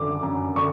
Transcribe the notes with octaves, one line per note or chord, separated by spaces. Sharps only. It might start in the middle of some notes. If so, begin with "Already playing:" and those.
Already playing: F#2 D3 D6
F#2
D3 C#6